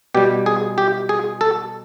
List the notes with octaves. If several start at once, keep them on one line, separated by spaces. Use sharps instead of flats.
B2 G3 G4
G#4
G4
G#4
A4